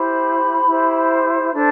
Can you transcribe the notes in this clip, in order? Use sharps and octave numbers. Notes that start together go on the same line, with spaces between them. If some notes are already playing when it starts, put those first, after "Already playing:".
Already playing: E4 G4 C5 B5
E4 G4 C5
D4 A4 C5